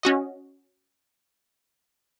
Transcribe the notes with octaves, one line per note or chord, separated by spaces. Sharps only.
C#4 F#4 D#5